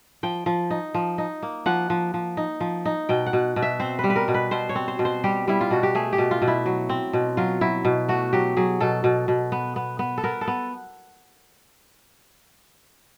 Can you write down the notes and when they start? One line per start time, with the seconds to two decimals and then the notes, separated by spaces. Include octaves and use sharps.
0.23 F3 G5
0.46 F3
0.71 D#4
0.95 F3
1.18 D#4
1.43 A#3
1.66 F3 F#5
1.90 F3
2.14 F3
2.37 D#4
2.61 F3
2.86 D#4
3.09 B2 G5
3.26 F#5
3.33 B2
3.56 B2
3.62 E5
3.80 C4 C5
3.99 G3 B4
4.10 B4
4.16 A#4
4.28 B2
4.34 B4
4.51 B2 C5
4.69 C#5
4.75 C4
4.88 C5
4.99 B2
5.05 C5
5.24 G3 G4
5.48 G3 E4
5.61 F4
5.71 B2 F#4
5.83 G4
5.95 A3 G#4
6.13 G4
6.18 B2
6.31 F4
6.42 B2
6.48 E4
6.66 F#3
6.89 C4
7.13 B2
7.37 F#3 F4
7.61 F#3 E4
7.85 B2
8.08 A3 F#4
8.33 F#3 G4
8.57 F#3 G#4
8.80 B2 A4
9.04 B2
9.28 B2
9.52 B3
9.76 B3
9.99 B3
10.18 A4
10.24 B3 A#4
10.41 A4
10.48 B3